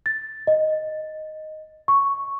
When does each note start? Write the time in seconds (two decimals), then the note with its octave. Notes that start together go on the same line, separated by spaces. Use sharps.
0.06 A6
0.47 D#5
1.88 C#6